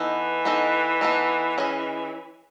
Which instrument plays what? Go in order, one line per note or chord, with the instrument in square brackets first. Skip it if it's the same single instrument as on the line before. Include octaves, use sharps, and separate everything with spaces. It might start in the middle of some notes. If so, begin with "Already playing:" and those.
Already playing: [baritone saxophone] E3 [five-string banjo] B3 D#4 A4 D#5
[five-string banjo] B3 D#4 A4 D#5
B3 D#4 A4 D#5
C#4 G#4 D#5